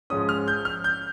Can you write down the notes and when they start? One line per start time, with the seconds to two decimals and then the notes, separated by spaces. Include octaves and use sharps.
0.10 G#2 F3 G#3 C#4 D#6
0.29 F6
0.48 G6
0.65 F6
0.84 G6